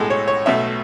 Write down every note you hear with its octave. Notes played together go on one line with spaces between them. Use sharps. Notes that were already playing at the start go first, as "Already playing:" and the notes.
Already playing: B1 A2 G#3 A4
C#5
C#5
B1 B2 A3 E5